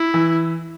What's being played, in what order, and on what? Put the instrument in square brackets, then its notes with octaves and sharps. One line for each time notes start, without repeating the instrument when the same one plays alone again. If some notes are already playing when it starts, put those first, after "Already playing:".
Already playing: [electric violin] E4
[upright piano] E3